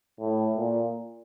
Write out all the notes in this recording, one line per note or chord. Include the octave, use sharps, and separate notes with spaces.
A2
A#2